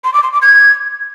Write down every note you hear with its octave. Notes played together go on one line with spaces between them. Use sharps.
C6
D6
C6
D6
G#6